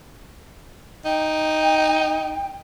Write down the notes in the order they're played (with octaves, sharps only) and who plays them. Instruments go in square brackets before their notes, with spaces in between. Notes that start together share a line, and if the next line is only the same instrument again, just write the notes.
[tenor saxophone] D#4 [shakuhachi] G5